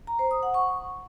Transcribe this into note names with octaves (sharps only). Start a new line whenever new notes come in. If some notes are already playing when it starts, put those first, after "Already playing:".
A#5
C5
D#6
F#5
C#6